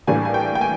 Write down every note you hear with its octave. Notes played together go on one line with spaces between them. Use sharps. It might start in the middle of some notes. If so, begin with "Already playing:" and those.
A2 E3 G3 A#3 D4 G#5
G#5
G5
G5
G#5